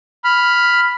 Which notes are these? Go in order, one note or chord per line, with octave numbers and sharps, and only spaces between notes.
B5 F6